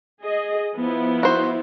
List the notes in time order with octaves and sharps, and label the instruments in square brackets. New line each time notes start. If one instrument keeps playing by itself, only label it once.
[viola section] G#4 D#5
F3 B3 E4
[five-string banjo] F#4 C5